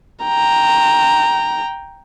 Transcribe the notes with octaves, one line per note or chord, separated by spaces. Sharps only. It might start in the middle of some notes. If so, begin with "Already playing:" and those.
G5 A#5